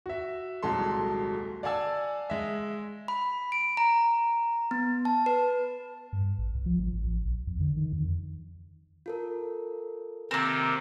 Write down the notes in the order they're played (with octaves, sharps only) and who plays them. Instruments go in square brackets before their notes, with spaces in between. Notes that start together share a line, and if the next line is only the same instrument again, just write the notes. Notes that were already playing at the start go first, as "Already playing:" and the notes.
[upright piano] F#4 E5
D#1 C2 F#3 G#3 A4 C6
D5 F5 F#5 G#5 A5 E6
G#3 E5
[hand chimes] B5
D7
A#5
B3
A5
B4
[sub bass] G2
A1
C2
F3
A1
A1
A1
A#1
F2
D3
D#3
F2
[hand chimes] F4 A4 A#4
[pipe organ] C3 D#3 [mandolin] A#3 C4